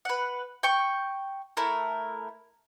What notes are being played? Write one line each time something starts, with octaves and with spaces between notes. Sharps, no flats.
B4 F#5
G5 C#6
A3 E4 A#4